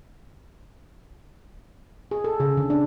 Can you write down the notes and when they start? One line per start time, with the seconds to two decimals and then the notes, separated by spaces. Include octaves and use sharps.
2.11 G#4
2.24 A4
2.40 C#3
2.57 D3
2.70 D4